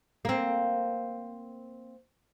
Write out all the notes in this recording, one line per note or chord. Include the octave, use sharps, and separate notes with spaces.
A#3 C4